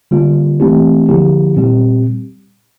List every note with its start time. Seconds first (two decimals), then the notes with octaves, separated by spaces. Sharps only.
0.11 D3 G3 A#3 F4
0.60 E3 A3 C4 E4 G4
1.09 D3 F3 A#3 E4 G4
1.57 A#2 G3 C4 G4